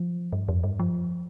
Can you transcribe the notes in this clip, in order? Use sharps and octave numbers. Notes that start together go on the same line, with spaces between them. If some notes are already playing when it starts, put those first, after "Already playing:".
Already playing: F3
G2
F2
G2
F3